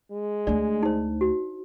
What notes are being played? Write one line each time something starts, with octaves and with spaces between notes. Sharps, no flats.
G#3
D2 A3 D4 D5
D#4 C5
F#4